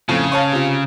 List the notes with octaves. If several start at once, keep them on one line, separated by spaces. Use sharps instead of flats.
F2 A2 C#3
C#5 F5 A5
C3 F4